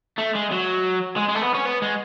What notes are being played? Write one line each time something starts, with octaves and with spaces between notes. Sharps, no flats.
A3
G#3
F#3
G#3
G#3
A3
B3
C#4
B3
G#3